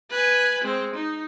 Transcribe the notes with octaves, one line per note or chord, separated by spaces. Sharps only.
B4 G#5
G#3 C4
D#4